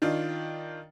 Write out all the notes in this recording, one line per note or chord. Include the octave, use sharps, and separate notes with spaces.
D#3 D4 F4